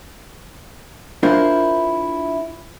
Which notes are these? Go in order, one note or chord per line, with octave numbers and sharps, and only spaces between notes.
D4 E4 F4 A#4 C5